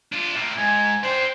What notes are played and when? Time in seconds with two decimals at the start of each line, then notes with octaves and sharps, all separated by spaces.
0.12 D4 F4
0.34 A2 A#3
0.58 G#2 G#5
1.04 D4 C5 G5